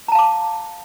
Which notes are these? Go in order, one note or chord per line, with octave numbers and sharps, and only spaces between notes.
F5 A5 A#5 D6